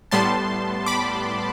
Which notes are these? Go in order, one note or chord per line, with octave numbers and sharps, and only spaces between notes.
A2 G3 B3 A5 C6
B5 D6